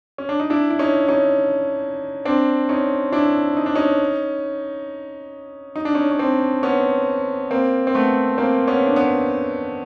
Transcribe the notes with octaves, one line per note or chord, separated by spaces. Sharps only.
C#4
D4
D#4
D4 E4
E4
C#4 D#4
C#4 D#4
C4 D4
C#4 D#4
D4 E4
D#4
D4
C#4 D#4
D#4
D4
C#4 D#4
C#4
C4 D4
B3 C#4
A#3 C4
C4
A3 B3
A#3 C4
B3 C#4
D4
B3 C#4